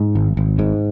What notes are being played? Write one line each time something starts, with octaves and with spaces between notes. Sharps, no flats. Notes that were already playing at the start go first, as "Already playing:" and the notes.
Already playing: G#2
G#1
G#1
G#2